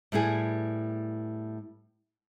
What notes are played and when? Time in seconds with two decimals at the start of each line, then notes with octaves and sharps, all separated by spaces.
0.12 A2 G3 B3 E4 G#4